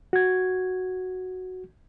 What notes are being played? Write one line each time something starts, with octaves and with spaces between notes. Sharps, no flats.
F#4 G#6